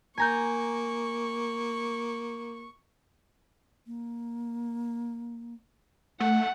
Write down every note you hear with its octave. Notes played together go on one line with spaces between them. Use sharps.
A#3 G#5 A#5 C#6 G6
A#3
A3 F#5